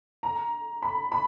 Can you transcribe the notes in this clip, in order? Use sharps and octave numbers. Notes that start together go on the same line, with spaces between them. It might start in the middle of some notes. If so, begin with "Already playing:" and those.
A#5
B5
B5